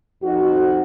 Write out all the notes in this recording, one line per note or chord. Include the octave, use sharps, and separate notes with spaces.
F2 D#4 F#4